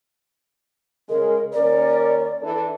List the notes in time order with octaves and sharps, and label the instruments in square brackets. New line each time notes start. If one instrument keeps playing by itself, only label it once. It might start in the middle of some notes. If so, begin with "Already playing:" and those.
[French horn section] C#3 G#3 [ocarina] A#4
[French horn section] D#2 C#4 A#4 [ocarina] D5
[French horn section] E3 D4 A4